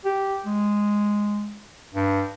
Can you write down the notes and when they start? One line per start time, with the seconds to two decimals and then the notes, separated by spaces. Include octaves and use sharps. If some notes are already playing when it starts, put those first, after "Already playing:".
0.05 G4
0.46 G#3
1.94 G2